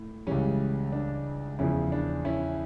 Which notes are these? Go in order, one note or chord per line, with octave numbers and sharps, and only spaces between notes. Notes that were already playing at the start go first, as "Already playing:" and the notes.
Already playing: A2
C#2 C#3 E3 G3 C#4
D4
E2 C#3 F3 C#4 E4
D4
C#4 E4